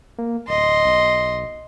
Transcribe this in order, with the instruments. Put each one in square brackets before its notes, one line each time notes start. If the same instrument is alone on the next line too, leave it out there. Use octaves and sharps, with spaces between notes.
[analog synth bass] A#3
[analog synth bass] D1 [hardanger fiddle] D#5 C6
[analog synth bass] B1